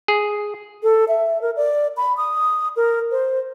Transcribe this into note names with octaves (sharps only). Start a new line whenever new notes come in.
G#4
A4
E5
A#4
D5
B5
D#6
A#4
C5